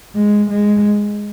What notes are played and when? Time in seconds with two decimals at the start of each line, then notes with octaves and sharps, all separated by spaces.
0.15 G#3
0.50 G#3